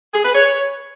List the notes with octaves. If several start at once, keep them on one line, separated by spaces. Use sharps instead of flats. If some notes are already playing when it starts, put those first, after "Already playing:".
G#4
B4
C#5